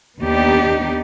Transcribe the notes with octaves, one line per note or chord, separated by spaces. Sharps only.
D#2 B3 D4 D#4 G4 D5